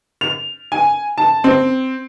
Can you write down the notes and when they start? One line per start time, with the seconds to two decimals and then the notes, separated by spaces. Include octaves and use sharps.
0.21 F7
0.72 G#5
1.18 A5
1.44 C4